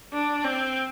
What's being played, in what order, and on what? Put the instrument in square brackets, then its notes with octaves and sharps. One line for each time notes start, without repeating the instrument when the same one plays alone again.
[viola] D4
C4